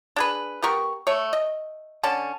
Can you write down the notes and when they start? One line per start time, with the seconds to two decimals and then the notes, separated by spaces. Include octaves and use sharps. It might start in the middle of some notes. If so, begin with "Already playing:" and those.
0.16 D4 G#4 B4
0.62 B3 G4 A#4 C#6
1.07 A3 C#5
1.33 D#5
2.03 D3 C#4 A5